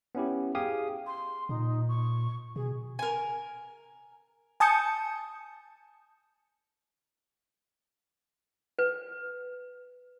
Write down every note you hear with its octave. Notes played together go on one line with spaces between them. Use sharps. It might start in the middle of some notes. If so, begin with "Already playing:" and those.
B3 C#4 E4 G4
G4 G#4 F5 G5 G#5 D#6
C6
A#2 D#4
C#6
B2 G#4
A#4 G#5
G#5 A5 D#6 G6 C#7
B4